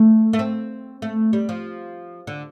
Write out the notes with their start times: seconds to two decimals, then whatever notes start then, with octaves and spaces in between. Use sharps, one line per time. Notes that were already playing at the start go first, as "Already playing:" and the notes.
Already playing: A3
0.33 A3
0.39 C4
1.02 A3
1.33 G3
1.49 F3
2.27 D3